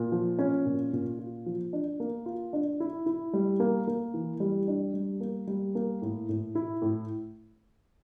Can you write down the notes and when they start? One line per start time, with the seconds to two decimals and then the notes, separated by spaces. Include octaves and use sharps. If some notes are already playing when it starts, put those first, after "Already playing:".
Already playing: A#2
0.12 F3
0.39 C#4
0.66 A#2
0.93 A#2
1.19 F4
1.46 F3
1.73 D4
2.00 A#3
2.26 F4
2.53 D4
2.80 E4
3.06 E4
3.33 G3
3.60 A#3
3.88 A#3
4.14 E3
4.40 G3
4.68 D4
4.94 G3
5.20 A#3
5.47 G3
5.75 A#3
6.02 A2
6.29 A2
6.55 E4
6.82 A2